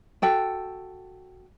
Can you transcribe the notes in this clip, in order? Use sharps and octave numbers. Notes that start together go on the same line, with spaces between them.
F#4 A4 G5